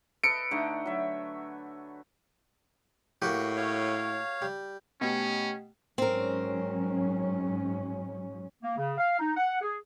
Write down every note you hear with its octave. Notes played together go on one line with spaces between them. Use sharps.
A4 B4 D#5 C#7 D7
D3 A3 D#4
F#3 E5
A2 A#3 F#4 G4
C#5 F5
G3
B2 A3 C#4 G4 G5
G#2 F#3 C4 C#4 A#4
A#3
C#3
F5
D#4
F#5
G#4